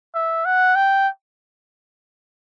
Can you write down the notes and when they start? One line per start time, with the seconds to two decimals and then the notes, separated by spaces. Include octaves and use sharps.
0.15 E5
0.45 F#5
0.76 G5